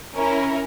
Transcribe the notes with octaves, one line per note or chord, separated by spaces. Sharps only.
C#4 E4 A#4